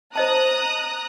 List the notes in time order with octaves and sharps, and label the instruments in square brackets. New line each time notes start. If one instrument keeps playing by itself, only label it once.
[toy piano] C5 D#5 A5 [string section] A#5 D#6 F#6